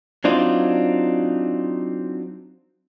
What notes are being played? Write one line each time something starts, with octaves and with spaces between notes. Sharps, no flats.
F#3 C4 D4 D#4 F4